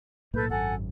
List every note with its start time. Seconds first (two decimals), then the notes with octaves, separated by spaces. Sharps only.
0.34 B1 A2 A#3 A4 B4 G6
0.49 G#1 F#2 A4 F#5 G#5